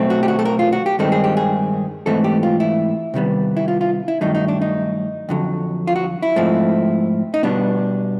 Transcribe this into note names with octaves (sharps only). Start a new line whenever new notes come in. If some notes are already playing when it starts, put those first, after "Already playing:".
Already playing: B2 F#3 A3 C4
F#4
G4
F#4
A4
A#4
F4
F#4
G4
G2 D#3 G#3 C4 A4
G#4
G4
G#4
G#2 E3 A3 C4 A4
G4
F4
E4
C3 D#3 G3 B3
E4
F4
F4
E4
G2 D#3 F#3 A3 D#4
D#4
D4
D#4
F2 D3 F#3
F4
F#4
E4
G#2 F3 A3 C4
D#4
B2 G3 B3 D4